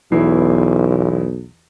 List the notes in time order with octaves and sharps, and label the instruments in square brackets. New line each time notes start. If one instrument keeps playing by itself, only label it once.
[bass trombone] B1 [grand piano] E2 E4 C7